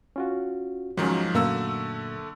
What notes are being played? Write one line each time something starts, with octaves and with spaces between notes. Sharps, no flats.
C#4 F4 F#4
G#2 D#3 F3 F#3 C#4
F#2 A#2 D3 A3 A#3 E6